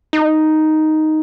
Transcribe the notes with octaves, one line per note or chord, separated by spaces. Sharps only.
D#4